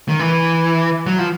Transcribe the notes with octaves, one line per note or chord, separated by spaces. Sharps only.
D#3
E3
F#3
F3